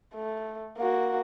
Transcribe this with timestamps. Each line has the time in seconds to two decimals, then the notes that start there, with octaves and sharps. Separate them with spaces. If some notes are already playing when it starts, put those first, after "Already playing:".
0.15 A3
0.78 A#3 F#4